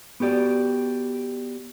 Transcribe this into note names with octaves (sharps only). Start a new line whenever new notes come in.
B3 F#4 G4 D5